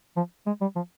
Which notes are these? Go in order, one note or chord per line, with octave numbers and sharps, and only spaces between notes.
F3
G#3
G3
F3